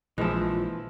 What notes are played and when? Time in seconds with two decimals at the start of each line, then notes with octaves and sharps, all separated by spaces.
0.18 A#1 E3 F3 G#3 E4 F4